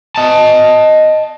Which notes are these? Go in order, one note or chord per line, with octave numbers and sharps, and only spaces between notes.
D#5 A5